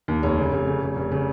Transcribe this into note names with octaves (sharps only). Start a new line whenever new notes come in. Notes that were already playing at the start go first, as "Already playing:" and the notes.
D#2
F1 C#5
C#3
F1
C#3
F1
F1
C#3